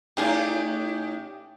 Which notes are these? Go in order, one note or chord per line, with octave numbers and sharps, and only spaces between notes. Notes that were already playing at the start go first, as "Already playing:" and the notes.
A2 C#4 D#4 G4 G#4 D5